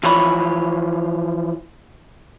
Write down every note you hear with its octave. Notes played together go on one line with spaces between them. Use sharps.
E3 F3 C#5 B5